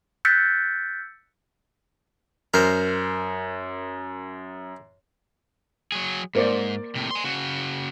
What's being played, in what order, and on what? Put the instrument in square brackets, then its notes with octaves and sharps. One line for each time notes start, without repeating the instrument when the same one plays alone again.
[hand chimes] E6 F#6 G6 A6 B6 C#7
[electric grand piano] F#2 [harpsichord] A#4 C5
[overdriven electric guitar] F#3 G#4
[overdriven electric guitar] G#2 [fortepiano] A#3 C5 D5
[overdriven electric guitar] A2 C3
G#5 C6
C#3 F#4